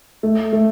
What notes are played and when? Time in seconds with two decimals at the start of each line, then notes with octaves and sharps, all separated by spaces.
0.23 A3
0.53 A3